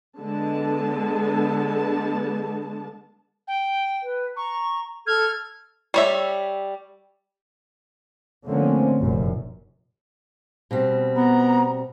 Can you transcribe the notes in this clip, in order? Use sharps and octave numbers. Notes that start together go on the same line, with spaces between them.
D3 G#3 B3 A5
G5
B4
A#5 C#6
A4 F6 G#6
G3 C#5 E5
D3 F3 A3 A#3 C4 C#4
F1 A#1 F#2
B2 G3 C4
B3 A#5